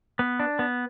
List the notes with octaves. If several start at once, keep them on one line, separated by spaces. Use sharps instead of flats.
B3
D4
B3